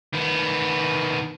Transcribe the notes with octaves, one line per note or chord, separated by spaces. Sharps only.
D#3 B3